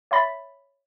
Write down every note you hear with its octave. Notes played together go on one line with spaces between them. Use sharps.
C#5 E5 G5 B5 A6 B6